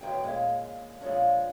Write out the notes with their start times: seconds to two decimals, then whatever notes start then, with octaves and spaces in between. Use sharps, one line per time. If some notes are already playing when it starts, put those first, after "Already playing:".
0.01 A2 D3 D#3 F#3 B3 G5
0.23 D#2 A#2 G#3 C#4
1.01 A#2 F3 G#3 C#4 D4